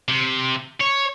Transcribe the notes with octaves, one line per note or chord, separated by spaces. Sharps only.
C3
C#5